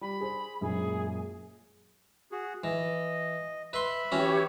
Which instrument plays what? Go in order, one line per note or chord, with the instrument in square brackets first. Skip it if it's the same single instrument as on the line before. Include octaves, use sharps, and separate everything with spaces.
[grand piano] G3 [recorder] B5
[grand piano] G#4 C5
[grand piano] F#2 A#2 G#3 [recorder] G#4
[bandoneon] F#4 G#4
[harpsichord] E3 [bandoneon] D#5
[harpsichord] B4 C6 [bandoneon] E5 B5
[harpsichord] E3 C#4 F#4 [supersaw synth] G4 C#5